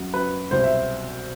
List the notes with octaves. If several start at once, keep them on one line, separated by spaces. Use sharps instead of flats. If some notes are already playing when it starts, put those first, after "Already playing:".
Already playing: F#2 F#3
F#2 F#3 B4
C2 B2 F#3 C5
E5